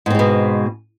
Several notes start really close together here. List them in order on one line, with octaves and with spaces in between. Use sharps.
G#2 C4 G#3 B2